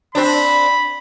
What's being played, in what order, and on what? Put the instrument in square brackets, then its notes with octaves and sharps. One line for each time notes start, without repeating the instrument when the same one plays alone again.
[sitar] C4 D4 [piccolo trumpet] B5